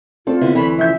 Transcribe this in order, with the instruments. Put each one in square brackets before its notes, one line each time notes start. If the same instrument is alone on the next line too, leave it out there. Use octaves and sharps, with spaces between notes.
[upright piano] A3 C4 D4 [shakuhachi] F4 [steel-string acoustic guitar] A4
[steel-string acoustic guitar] D3 B3 E4
[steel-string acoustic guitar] D2 E3 [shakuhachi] B5
[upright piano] C#3 F3 G6 [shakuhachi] E5